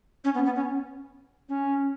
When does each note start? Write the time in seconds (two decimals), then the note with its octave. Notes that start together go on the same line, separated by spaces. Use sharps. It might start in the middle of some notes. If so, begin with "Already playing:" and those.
0.24 C#4
0.34 B3
0.45 B3
0.55 C#4
1.48 C#4